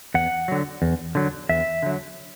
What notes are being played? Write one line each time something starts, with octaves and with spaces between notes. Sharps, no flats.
E2 F#5
D3 F#3
E2
D3 F#3
E2 E5
D3 F#3